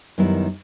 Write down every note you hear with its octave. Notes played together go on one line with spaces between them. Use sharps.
F#2 D#3 G3 B3 E4